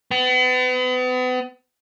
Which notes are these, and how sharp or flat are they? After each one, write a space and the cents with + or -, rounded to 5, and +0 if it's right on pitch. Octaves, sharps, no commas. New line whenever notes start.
B3 +40